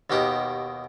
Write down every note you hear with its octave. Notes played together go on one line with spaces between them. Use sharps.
D#2 B2 D#3 G4 F#5